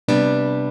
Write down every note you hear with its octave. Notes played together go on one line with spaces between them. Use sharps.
C3 G3 B3 D4